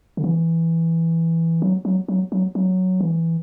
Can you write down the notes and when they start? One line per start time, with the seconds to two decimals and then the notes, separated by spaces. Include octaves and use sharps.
0.17 D3
0.24 E3
1.62 F#3
1.85 F#3
2.08 F#3
2.32 F#3
2.55 F#3
3.00 E3